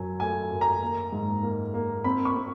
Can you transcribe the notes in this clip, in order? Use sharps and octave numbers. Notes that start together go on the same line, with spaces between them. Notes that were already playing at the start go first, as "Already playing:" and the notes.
Already playing: F#2 F#3 G#5
A3 G#5
F#2
A#5
A#3
G#2
A#3
A#3
C4 B5
C#6
C4